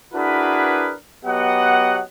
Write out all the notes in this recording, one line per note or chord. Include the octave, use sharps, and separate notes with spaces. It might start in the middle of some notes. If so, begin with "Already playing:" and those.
D4 E4 F#4 G#4 A#4 B4
F#3 B3 G4 D#5 F#5